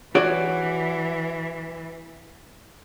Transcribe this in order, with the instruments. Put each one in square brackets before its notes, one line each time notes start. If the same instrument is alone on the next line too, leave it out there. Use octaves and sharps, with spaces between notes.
[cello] E3 [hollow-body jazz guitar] F#4 C#5 D5